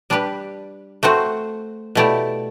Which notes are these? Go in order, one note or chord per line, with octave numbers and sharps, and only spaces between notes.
G3 D4 G4 B4
A3 C4 F#4 C5
B2 A3 E4 G4 D5